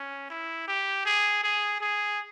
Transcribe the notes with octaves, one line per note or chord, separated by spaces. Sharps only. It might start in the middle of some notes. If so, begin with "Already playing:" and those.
Already playing: C#4
E4
G4
G#4
G#4
G#4